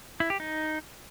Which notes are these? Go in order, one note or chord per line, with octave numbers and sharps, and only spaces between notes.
E4
G4
D#4